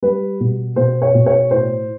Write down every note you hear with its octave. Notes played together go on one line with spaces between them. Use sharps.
G3 B4
B2
B2 C5
C#5
B2
C#5
A2 C5